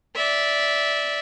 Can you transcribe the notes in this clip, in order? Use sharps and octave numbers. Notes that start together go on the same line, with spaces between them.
D5 E5